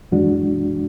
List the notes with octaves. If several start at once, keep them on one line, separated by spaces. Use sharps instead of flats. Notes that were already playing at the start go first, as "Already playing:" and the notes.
F#2 E3 G#3 D4 F#4